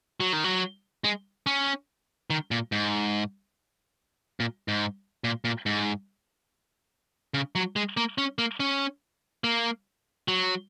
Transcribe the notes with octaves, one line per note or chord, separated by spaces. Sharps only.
F#3
D#3
F#3
G#3
C#4
D#3
A#2
G#2
A#2
G#2
A#2
A#2
G#2
C#3
F#3
G#3
A#3
C#4
A#3
C#4
A#3
F#3